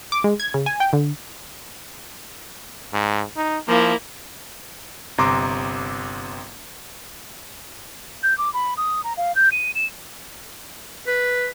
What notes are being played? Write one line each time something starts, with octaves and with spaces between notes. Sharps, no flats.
D6
G#3
G#6
C#3
G#5
G5
D3
G#2
D#4
F3 A#3 E4
G1 C3 A#5 C6 D6
G6
D6
B5
D#6
A#5
F5
G6
D#7
E7
B4